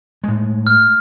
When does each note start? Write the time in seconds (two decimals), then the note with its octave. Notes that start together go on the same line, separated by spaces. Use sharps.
0.24 A2 G#3
0.67 F6